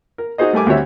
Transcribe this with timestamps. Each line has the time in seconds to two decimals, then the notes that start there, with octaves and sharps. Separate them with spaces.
0.18 A#4
0.38 D#4 F#4 G#4 C5 D#5
0.53 G3 A3 A#4 G#5 D6
0.66 D2 G3 C4 F#4 C#5 E5